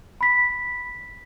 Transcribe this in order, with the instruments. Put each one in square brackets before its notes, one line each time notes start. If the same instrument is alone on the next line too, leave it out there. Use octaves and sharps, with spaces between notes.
[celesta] B5 B6